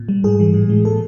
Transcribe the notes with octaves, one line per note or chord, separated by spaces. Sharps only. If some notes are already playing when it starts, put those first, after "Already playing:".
Already playing: A#2
G3
G#2 G#4
E3 G3
A2
E3 G#3
A#2 A4